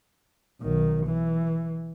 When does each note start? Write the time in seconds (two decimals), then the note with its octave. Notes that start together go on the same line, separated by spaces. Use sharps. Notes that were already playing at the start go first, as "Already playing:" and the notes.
0.61 B1 D#3
1.06 E3